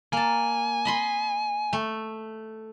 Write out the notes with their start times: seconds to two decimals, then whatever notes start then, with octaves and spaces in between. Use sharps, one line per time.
0.13 A#3 G#5 A5
0.85 D#5 B5 C6
1.73 A3